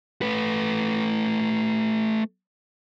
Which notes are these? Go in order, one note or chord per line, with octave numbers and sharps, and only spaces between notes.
A3 B4